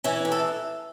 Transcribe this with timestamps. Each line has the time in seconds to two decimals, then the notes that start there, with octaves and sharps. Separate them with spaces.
0.04 E3 C#4
0.25 A2
0.32 A4